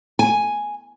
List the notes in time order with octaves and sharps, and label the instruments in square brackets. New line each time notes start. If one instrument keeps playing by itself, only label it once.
[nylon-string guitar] G#5